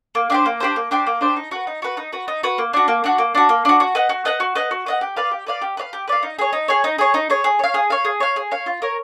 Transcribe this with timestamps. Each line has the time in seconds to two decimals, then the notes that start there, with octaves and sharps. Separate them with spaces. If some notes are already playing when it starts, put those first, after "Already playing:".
0.15 A#3
0.30 D4 G4 C5
0.46 A#3
0.60 D4 G4 C5
0.76 A#3
0.91 D4 G4 C5
1.07 A#3
1.21 D4 G4 C5
1.36 D#4
1.51 F#4 B4
1.67 D#4
1.82 F#4 B4
1.97 D#4
2.12 F#4 B4
2.28 D#4
2.43 F#4 B4
2.58 A#3
2.73 D4 F#4
2.88 A#3
3.04 D4 F#4
3.18 A#3
3.35 D4 F#4
3.49 A#3
3.65 D4 F#4
3.80 F#4
3.95 B4 D#5 F#5
4.09 F#4
4.25 B4 D#5 F#5
4.40 F#4
4.55 B4 D#5 F#5
4.71 F#4
4.86 B4 D#5 F#5
5.01 G4
5.16 B4 D5 F5
5.31 G4
5.47 B4 D5 F5
5.62 G4
5.77 B4 D5 F5
5.93 G4
6.08 B4 D5 F5
6.23 D#4
6.39 G#4 C#5
6.53 D#4
6.68 G#4 C#5
6.84 D#4
6.98 G#4 C#5
7.14 D#4
7.30 G#4 C#5
7.44 G#4
7.59 C#5 F5
7.74 G#4
7.90 C#5 F5
8.05 G#4
8.20 C#5 F5
8.36 G#4
8.51 C#5 F5
8.66 F4
8.82 A#4 C#5